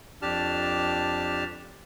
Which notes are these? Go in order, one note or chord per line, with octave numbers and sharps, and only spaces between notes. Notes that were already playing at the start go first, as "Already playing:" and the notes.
F2 D4 G4 A5 F6